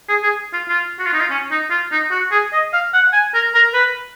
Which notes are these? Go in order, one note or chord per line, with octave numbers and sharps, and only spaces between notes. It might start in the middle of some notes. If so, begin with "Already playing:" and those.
G#4
G#4
F4
F4
F#4
F4
D#4
F4
C#4
D#4
F4
D#4
F#4
G#4
D#5
F5
F#5
G#5
A#4
A#4
B4